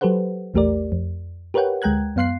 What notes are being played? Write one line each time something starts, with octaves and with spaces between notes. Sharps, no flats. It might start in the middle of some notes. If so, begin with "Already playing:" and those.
F#3 G4 A4 B4 C5 F#5
A#1 E2 A3 G4 A#4 D5
F2
G4 A#4 B4 C#5 F#5 G5
D2 G#3 G5 A#5 F#6 G#6
F#2 B3 F5 C6 F#6 C7